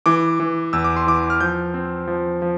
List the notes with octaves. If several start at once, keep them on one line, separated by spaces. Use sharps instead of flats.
E3 D6
E3
E2 E6
D6
C6
E3 D6
F6
F3 G6
C4
F3
F3